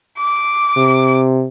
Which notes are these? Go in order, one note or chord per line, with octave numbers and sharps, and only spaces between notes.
D6
C3